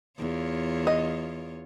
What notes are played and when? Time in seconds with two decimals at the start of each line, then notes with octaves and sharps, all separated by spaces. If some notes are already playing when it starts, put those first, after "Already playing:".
0.19 E2 F4 C#5
0.87 D#5